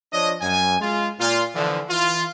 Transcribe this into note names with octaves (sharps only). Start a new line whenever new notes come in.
F3 D4 C#5 D#5
F#2 G#5
G#3 F4
A#2 F4
D3 E3 F3
E3 F4